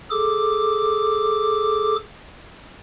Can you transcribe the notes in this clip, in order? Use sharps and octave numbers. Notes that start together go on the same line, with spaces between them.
G#4 A4 D6